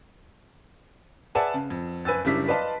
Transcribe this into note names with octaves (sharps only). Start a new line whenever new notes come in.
G#4 B4 D5 E5 F#5 A5
C#3
F2
F#1 B4 G#5 E6 A6
F#1 C#3 G3 D4 E4 B6
B4 D5 D#5 F5 A5 C6